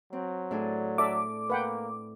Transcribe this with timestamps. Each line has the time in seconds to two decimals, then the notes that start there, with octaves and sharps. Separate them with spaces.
0.13 F#3 C4
0.51 A2 D4 G#4
0.98 A4 D5 E5 D6
1.50 A#3 B4 F#5 G5